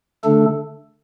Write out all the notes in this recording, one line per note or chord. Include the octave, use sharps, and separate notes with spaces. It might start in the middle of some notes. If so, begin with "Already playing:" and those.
D3 A3 D4 A4